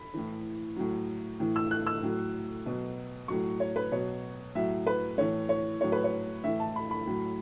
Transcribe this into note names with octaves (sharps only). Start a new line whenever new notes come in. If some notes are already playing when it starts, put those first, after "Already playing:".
Already playing: B5
A2 E3
A2 F#3
A2 E3
E6
F#6
E6
A2 F#3
B2 F#3
A2 F#3 C#6
C#5
B4
B2 F#3 C#5
A2 F#3 E5
B4
A2 E3 C#5
C#5
A2 F#3 C#5
B4
C#5
A2 E3 E5
A5
B5
B5
A2 F#3